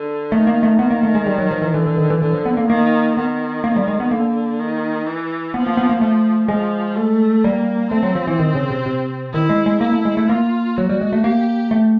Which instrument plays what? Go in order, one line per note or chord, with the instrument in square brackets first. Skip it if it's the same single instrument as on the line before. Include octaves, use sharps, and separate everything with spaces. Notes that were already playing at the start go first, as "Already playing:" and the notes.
Already playing: [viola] D3
[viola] D#3 [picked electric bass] A3
[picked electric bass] A#3
A3
[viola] D#3 [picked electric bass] B3
[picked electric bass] A#3
A3
G#3
G3
F#3
F3
E3
[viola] D3 [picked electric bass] E3
[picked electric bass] E3
D#3
E3
[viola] D3 [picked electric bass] E3
[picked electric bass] F3
B3
A#3
[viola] D#3 [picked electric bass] A#3
[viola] D#3 [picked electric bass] B3
[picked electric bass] A#3
G3
G#3
B3
[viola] D3 [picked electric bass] A#3
[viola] D#3
E3
[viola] F3 [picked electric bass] B3
[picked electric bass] A#3
B3
A#3
[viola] F3 [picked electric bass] A3
[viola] F3 [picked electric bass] G#3
[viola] A3
[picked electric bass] G3 [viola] A#3
[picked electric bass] A3 [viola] C4
[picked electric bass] F#3
F3
E3
D#3
C#3
C3
C3
[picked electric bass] D#3 [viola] E4
[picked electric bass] G#3
G#3
[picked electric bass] A#3 [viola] E4
[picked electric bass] A3
G#3
A3
[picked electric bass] A#3 [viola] F4
[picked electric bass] F#3 [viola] F#4
[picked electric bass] G3
G#3
A3
[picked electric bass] A#3 [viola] G4
[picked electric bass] A3